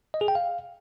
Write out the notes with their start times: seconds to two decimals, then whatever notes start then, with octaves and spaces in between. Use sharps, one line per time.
0.14 D#5
0.21 G#4
0.28 G5
0.35 F5